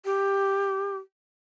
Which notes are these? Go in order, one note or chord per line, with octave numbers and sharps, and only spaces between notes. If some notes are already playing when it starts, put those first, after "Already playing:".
G4